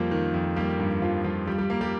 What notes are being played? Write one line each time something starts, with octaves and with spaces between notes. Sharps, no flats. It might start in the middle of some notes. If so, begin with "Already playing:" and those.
Already playing: F2 F3 G3 A#3 F4
D#3
F2
G3 A#3 G4
G2
F3 F4
G2 F3 F4
F3 G3 G4
G3 G4
A#3 A#4
G3 G4